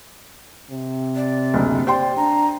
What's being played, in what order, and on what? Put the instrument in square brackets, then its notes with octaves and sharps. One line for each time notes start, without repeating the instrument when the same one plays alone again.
[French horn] C3
[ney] D5
[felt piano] F#1 D2
[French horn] G4 [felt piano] C5 G5 C6 [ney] D5
[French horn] D4 [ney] A#5